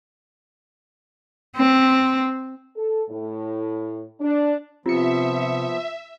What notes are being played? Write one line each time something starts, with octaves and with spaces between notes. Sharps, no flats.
C4
A4
A2
D4
C3 F3 B3 F4 E5 C#7